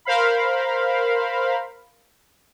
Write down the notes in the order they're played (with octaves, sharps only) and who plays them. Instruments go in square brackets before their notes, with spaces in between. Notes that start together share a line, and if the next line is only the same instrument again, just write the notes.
[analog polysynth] A#4 C5 F5 B5